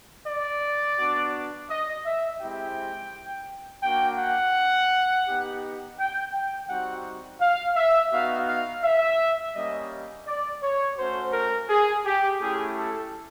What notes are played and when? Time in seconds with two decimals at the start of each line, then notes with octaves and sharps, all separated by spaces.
0.26 D5
0.98 B3 D4 F#4
1.69 D#5
2.05 E5
2.40 G#3 C4 E4 G4 G5
3.83 A#3 D4 F#4 G5
4.19 F#5
5.27 B3 D#4 G4
5.98 G5
6.33 G5
6.69 G3 C4 D#4 F#4 F#5
7.41 F5
7.76 E5
8.11 B3 D#4 F#4 F5
8.48 F5
8.83 E5
9.54 G3 A#3 C#4 D#5
10.26 D5
10.62 C#5
10.98 A3 C#4 F#4 C5
11.32 A#4
11.69 G#4
12.05 G4
12.40 A3 C#4 E4 G4 G#4
12.76 A4